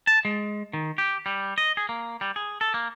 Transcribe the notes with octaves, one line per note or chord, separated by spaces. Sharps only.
A5
G#3
D#3
G4
G3
D#5
G#4
A#3
G3
G#4
A4
A#3